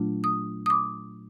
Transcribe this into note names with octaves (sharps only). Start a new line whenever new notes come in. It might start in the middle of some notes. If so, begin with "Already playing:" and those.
Already playing: A#2 F#3 A3 D4 F4
D#6
D#6
D6